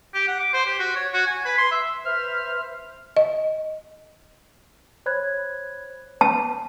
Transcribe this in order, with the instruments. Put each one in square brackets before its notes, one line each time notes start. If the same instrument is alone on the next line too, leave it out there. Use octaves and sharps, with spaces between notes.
[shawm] G4
F#5
D6
C5
G4
F#4
C#5
F#4
G#5
B4
C6
E5
[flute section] B4 C5 E5 [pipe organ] F6
[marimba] D#5
[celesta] C5 C#5 B5 F#6 G#6
[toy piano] A5